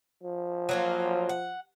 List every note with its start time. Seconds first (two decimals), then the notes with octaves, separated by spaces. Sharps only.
0.24 F3
0.69 F#3 A#3 F4
1.29 F#5